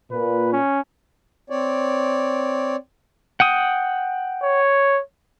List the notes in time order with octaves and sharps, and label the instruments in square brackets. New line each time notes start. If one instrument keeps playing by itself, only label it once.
[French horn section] A#2 [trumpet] B4
[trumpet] C#4
[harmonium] C4 C#5 D5
[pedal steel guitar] F#5 G5 D#6
[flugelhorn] C#5